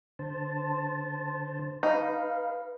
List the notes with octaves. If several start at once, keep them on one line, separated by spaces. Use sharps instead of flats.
D3 C5 A5
D#4 B4 F5